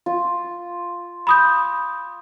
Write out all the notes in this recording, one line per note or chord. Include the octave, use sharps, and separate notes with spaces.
F4
B5 D#6 G6